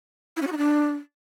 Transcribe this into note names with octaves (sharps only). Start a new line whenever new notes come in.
E4
C#4
F#4
D#4
D4